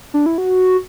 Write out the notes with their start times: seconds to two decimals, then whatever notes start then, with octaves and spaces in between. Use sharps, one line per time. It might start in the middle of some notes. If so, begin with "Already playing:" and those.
0.14 D4
0.26 E4
0.38 F#4